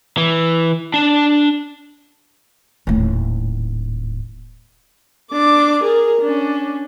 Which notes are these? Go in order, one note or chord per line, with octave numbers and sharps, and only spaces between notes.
E3
D4 A5
D#1 A2
D4 D6
G#4 A#4
C#4 D4